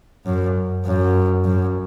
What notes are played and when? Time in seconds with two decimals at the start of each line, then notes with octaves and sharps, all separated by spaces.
0.25 F#2
0.85 F#2
1.45 F#2